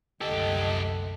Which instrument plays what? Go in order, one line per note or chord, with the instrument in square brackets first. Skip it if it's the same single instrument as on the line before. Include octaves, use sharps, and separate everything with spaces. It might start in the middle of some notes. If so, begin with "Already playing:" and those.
[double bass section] F#1 C2 A3 [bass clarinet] D3 [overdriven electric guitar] G4 A4 [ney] D#5